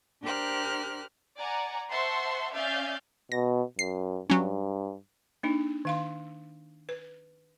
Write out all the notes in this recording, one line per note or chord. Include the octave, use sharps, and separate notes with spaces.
D4 G4 A#4 C5 F6 F#6
D5 F#5 G#5 A#5
C5 E5 F#5 A5 C6 C#6
C#4 D5 E5 F5 G6 A6
B2 A#6
F#2 C7
G2 F#3 C#4
A#3 D4 D#4
D#3 F5 C6
B4